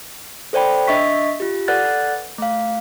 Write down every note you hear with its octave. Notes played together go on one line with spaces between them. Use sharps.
A4 C5 D5 G5 B5
D4 D#5 E5 C#6 B6
F4 G4
A4 B4 D5 F#5 F#6 A6
A3 F5